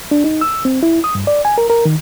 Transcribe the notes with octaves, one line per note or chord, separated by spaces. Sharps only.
D4
D#4
E6
C4
E4
D#6
G2
D5
G#5
A#4
A#4
D#3